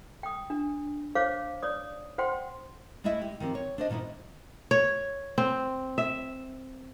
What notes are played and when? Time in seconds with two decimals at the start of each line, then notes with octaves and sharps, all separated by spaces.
0.23 G5 D#6
0.50 D4
1.15 C5 C#5 F5 D6
1.62 C#5 D5 D#6
2.18 C5 F#5 G5 C6
3.04 G#3 A3 E4 D#5 E5
3.22 G4
3.40 D#3 F3 C4 G4
3.55 C#5
3.78 D4 C5 D#5
3.90 A#2 D#3 B3 D#4 E4
4.71 C#5
5.38 C4
5.98 E5